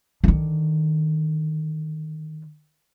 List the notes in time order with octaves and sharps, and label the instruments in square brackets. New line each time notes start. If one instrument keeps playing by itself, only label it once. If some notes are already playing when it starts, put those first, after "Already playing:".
[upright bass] D3 D#3